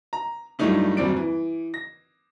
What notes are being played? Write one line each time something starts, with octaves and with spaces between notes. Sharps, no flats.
A#5
G2 F#3 G3 A3 D#4 E4
D#1 F#2 G3 C4 D5 D7
E3
A#6